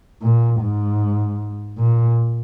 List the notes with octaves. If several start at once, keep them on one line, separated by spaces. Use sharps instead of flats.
A#2
G#2
A#2